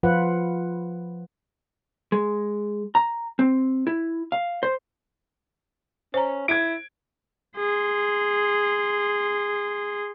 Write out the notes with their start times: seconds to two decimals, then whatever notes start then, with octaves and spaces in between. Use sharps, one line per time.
0.03 F3 F4 B4 F#5
2.12 G#3
2.95 A#5
3.39 C4
3.87 E4
4.32 F5
4.63 C5
6.14 C#4 C5 A#5
6.48 E4 G#6 D7
7.57 G#4 C6